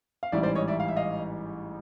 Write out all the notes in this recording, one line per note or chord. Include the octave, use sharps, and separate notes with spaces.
F5
A1 G#2 E3 G3 D5 E5
C5 D5
C#5 D#5
D5 E5
F5
E5
D#5 F5